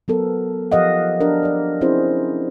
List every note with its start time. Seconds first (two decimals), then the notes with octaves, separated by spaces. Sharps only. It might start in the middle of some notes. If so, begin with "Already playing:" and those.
0.08 F#3 B3 A4 A#4
0.72 F3 G4 A#4 D#5 F5 F#5
1.20 D4 G4 A#4
1.43 C#5 D5
1.81 C4 C#4 E4 G#4 C5